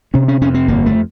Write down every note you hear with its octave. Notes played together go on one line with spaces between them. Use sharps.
C3 C#4
C#4
F2 C#4
C4
G1 A#3
A3